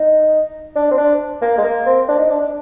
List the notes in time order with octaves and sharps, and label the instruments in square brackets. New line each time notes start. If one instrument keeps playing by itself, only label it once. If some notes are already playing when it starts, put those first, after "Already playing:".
Already playing: [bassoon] D#4
D4
C4
D4
A#3
G#3
A#3
C4
D4
D#4
D4
D4